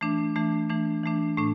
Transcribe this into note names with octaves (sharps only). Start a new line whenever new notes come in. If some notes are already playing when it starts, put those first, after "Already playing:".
E3 A3 D4
E3 A3 D4
E3 A3 D4
E3 A3 D4
A2 A3 D4